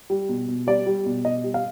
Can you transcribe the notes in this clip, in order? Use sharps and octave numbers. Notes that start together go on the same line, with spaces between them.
G3
B2
B2
G3 D5
G3
B2
B2 D#5
G3
F5